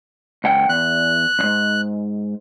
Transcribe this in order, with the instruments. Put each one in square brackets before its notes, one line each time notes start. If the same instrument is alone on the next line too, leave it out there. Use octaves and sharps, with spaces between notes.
[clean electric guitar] C#2 F#5 G5
[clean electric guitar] E2 [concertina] F#6
[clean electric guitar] B1 G#2